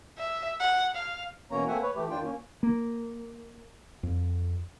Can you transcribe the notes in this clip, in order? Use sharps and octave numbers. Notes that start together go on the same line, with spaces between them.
E5
F#5
F5
B2 E3 A#3 C#4 C#5 A#5
A3 A#3 C4 E5 F#5 G#5
B4 C#5
E3 A3 G4
F#2 D#3 D4 F4 G5
A#3 C#4
A#3
F2